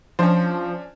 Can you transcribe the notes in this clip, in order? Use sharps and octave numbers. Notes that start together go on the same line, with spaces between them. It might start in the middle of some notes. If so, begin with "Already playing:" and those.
F3 C#4 D4 C5